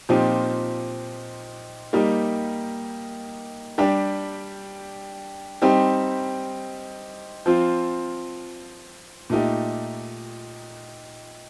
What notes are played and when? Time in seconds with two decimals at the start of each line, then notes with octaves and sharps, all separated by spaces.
0.09 A#2 F3 C4 D#4 G4
1.93 G3 A#3 D#4 G4
3.78 G3 D4 G4
5.62 G3 C4 D#4 G4
7.46 F3 C4 F4
9.30 A#2 A3 D#4 G4